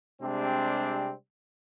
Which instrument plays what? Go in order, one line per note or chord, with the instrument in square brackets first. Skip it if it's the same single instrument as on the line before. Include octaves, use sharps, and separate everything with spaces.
[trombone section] C3 G3 G#3 C4 D4